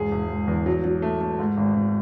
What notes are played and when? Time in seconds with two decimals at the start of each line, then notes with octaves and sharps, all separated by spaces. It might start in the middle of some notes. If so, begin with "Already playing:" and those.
Already playing: E1 G#2 G#4
0.11 E1
0.30 E1
0.47 E2
0.66 F#3
0.84 F#3
1.02 A3
1.21 A3
1.39 G#2
1.57 G#1
1.75 G#1